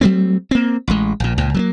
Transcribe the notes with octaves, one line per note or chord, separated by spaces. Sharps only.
F#3 G3 A3 C4
A#3 C4
A1 G#3
A#1 A#2
C#2 A#2
F#3 A3 A#3